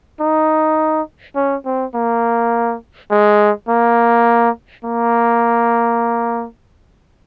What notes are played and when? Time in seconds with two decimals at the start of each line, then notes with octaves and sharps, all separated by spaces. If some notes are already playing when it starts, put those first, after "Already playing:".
0.21 D#4
1.36 C#4
1.66 C4
1.95 A#3
3.11 G#3
3.69 A#3
4.85 A#3